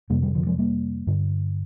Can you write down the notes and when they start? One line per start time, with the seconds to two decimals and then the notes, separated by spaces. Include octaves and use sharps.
0.10 F2 C3 G3 A#3
0.22 D#3 G3
0.35 D3 F3
0.46 F3 G#3
0.58 G3 A#3
1.07 G2 D3